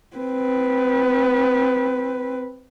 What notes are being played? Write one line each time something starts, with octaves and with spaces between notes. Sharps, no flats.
C4 B4